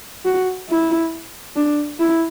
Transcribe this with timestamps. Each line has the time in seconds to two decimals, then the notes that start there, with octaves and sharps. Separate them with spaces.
0.25 F#4
0.69 E4
1.56 D4
2.00 E4